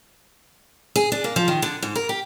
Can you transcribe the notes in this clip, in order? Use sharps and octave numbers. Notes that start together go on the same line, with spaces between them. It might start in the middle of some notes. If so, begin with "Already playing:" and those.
G#4
D4
A#3
F3
D#3
D3
G#2
A#4
G4